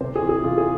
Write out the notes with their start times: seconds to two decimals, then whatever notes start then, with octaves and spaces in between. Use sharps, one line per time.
0.01 C3 C5
0.16 G#4
0.22 E3
0.29 G#4
0.44 C3 F4
0.58 G#4